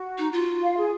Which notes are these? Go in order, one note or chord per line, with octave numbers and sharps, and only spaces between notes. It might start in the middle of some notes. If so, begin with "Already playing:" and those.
Already playing: F#4
D#4
F4
F5
G#4